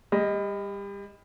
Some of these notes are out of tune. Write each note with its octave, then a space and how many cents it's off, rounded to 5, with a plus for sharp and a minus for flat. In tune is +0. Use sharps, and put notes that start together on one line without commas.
G3 +30 D#5 +0